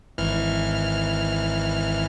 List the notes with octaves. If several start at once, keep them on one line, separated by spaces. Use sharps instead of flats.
G#1 E3 F6